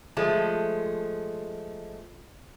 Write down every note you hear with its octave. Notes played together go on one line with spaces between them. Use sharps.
F3 G#3 A3